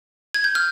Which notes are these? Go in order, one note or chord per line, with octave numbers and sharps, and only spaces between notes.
G#6
G6
F6